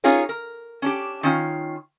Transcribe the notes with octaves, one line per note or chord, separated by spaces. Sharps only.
C#4 D#4 F4 G#4 A#4 C#5
A#4
C#4 D4 G4
D#3 C#4 F4